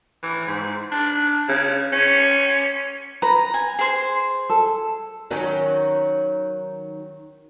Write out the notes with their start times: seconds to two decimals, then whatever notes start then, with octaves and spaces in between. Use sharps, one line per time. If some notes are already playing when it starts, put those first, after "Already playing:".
0.23 E3
0.47 G#2
0.92 D4
1.48 C#3
1.93 C#4
3.22 B4 A#5
3.54 G#5
3.79 G#4 C5
4.50 A4
5.31 D#3 F#3 C#4